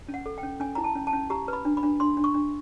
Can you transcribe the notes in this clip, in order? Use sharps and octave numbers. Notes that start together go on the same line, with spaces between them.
C#4
F#5
A4
G5
C#4
C#4 G#5
E4 A#5
A5
C#4
A5
C#4
G4 A#5
B4
B5
D4
B5
D4
D4 C6
D4
C#6
D4